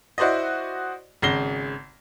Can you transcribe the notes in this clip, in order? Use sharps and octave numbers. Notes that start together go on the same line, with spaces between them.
E4 F#4 C5 D5 D#5
G#1 C#3 A#6 C7 G7